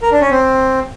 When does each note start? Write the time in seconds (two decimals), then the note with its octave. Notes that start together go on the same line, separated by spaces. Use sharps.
0.02 A#4
0.12 D4
0.21 C#4
0.30 C4